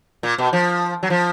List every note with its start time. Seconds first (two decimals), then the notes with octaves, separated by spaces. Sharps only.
0.23 A#2
0.38 B2
0.53 F3
1.03 F#3
1.10 F3